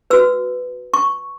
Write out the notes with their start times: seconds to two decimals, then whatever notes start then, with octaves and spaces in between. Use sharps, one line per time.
0.10 F#4 B4 E6
0.94 C#6